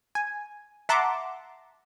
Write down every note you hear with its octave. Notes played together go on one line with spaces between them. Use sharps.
G#5
E5 F#5 A5 A#5 C6 D6